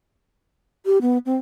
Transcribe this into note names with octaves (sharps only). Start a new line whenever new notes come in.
G4
B3
C4